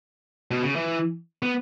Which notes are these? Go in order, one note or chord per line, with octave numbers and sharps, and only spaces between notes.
B2
C#3
E3
B3